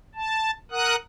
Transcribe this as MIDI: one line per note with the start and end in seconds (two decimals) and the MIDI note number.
0.15 0.51 81
0.71 0.96 70
0.71 0.96 78
0.71 0.96 87
0.71 0.96 90